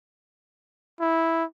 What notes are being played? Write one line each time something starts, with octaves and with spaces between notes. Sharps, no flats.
E4